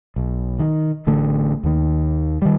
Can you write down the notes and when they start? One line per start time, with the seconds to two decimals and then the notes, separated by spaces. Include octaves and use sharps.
0.16 B1
0.59 D#3
1.07 A1 D3 A3
1.63 D#2 D#3
2.42 D#3 G3